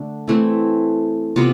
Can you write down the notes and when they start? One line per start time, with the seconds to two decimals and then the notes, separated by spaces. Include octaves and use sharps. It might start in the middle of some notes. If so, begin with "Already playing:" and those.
Already playing: D3 A3 D4
0.28 E3 A3 C4 E4
1.36 C3 E3 B3 F4